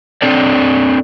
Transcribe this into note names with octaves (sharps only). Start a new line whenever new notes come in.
C4 D4 A4 D5